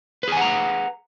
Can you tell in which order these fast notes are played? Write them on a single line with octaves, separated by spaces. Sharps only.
B4 G#4 G#5 F#5 A#5